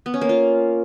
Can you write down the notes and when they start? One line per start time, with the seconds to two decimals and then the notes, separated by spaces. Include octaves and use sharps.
0.06 B3
0.14 C#4
0.21 A#3
0.29 F4